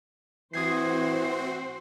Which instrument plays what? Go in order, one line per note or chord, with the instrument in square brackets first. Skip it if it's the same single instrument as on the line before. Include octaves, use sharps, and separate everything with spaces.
[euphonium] E3 [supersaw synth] C4 F#4 [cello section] C5 [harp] D#6 G#6 C7